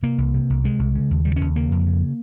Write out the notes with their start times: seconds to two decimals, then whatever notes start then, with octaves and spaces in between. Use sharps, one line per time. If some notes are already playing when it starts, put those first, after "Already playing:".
0.03 C3 A#3
0.18 C2
0.34 C3
0.50 C2
0.64 C3 G#3
0.79 C2
0.95 C#3
1.11 D#2
1.25 C#3 G3
1.36 D#2 C#4
1.56 C#3 A#3
1.71 F2
1.87 C#3